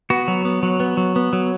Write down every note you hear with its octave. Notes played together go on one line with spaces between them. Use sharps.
B3 F#4
F#3
B3
F#3
B3
F#3
B3
F#3